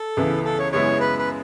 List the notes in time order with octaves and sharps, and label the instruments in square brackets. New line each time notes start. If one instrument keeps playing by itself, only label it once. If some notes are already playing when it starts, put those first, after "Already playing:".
Already playing: [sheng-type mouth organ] A4
[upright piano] C#2 C#3 E3 B3 E4
[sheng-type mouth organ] A4
C#5
[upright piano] F#2 C#3 G#3 B3 E4 [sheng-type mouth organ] C#5
[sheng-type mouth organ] B4
B4